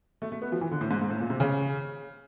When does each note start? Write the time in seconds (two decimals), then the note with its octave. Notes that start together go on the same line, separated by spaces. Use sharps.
0.22 A3
0.32 A3
0.42 B3
0.52 F3
0.61 E3
0.71 D3
0.81 A2
0.91 G#2
1.01 G#2
1.10 A2
1.20 A#2
1.30 C3
1.40 C#3